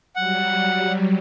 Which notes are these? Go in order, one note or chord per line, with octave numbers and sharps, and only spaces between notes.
F#3 G3 F#5